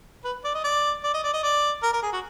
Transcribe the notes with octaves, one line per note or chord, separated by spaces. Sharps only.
B4
D5
D#5
D5
D5
D#5
D5
D#5
D5
A#4
A#4
G#4
F#4